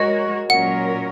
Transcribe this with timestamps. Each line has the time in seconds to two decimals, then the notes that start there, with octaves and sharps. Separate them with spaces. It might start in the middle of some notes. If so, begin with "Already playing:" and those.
Already playing: G#3 F#4 A#4 C#5 D#5
0.50 A#2 F#3 C#4 A#4 C#5 F#5